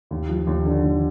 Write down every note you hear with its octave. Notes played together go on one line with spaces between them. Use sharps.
D#2
F3
D#2
D3
D#2